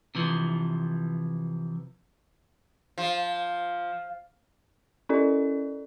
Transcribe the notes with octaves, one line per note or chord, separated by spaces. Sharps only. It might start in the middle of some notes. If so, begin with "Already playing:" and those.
C3 E3 F3
F3
C#4 E4 A4 D5